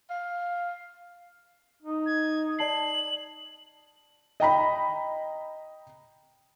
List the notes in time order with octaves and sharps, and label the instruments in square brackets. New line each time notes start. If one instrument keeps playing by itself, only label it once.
[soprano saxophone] F5
[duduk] D#4
[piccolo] G#6
[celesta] D5 A5 C7 [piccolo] F#7
[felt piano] D#5 G5 A#5 B5